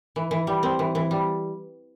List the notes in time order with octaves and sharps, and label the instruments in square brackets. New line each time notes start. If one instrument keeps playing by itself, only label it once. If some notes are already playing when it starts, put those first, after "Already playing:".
[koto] E3
E3
G3
C4
E3
E3
G3